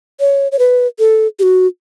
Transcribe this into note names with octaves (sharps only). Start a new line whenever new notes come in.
C#5
C#5
B4
A4
G4
F#4